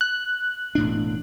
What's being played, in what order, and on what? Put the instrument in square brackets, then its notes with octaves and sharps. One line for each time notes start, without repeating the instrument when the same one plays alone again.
[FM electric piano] F#6
[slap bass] E1 A2 D4